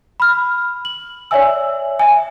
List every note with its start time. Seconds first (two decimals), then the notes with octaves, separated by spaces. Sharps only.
0.20 B5 F6
0.85 F#7
1.31 C#5 D5 E5 G#5 E6
1.99 E5 G#5